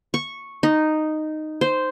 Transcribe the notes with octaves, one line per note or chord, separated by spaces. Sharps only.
C#6
D#4
C5